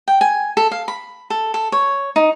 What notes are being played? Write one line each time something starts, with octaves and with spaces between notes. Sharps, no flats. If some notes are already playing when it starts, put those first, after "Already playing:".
G5
G#5
A4
F5
B5
A4
A4
C#5
D#4